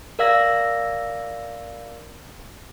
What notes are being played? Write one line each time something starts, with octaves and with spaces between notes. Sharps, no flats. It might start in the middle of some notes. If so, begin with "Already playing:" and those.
A#4 D5 F5 E6 A#6